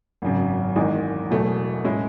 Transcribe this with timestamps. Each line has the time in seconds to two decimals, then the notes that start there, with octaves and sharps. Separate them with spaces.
0.22 G#1 F#2 C#3
0.76 E1 E2 D#3 G#3 D#4
1.30 E1 E2 B2 F#3 A3
1.85 A2 G#3 C#4 E4